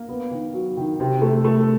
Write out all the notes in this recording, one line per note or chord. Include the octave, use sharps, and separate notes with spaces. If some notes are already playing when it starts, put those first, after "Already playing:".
Already playing: A#3
B3
D#3
F#3
D#3
C3
A3
A3